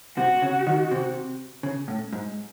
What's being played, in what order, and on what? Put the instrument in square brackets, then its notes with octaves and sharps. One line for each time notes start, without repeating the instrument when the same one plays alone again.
[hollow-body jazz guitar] C3 [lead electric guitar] F#4
[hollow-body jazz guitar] C#3
D#3
C3
C#3
A2
G#2